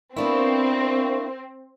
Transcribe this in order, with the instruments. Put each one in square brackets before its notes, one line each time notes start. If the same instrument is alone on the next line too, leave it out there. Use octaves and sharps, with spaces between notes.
[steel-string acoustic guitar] B3 D4 E4 [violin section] C4 [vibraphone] A#4 F5 C#6